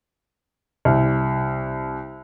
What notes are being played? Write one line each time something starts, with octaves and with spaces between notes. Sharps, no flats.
C2